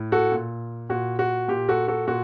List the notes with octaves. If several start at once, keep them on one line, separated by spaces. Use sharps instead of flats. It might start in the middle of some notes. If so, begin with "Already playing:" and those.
Already playing: A2
F#4 A4
A#2
A#2 F#4
F#4
A#2 G4
F#4 A4
F#4 A4
A#2 F#4